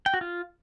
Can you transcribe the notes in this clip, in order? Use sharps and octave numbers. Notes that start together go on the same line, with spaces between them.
G5
F#4
F4